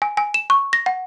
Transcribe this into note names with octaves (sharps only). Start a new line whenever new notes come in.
G#5
G#5
E7
C#6
A#6
F#5